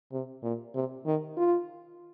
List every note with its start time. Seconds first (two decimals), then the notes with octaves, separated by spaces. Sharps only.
0.12 C3
0.43 A#2
0.75 C3
1.06 D#3
1.37 F4